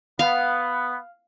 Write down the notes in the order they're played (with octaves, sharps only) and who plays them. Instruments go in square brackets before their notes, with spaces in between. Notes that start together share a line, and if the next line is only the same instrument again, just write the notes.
[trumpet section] B3 [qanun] F5